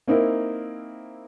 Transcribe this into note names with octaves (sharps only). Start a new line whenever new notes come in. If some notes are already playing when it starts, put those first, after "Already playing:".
A#3 C4 D#4 E4 A#4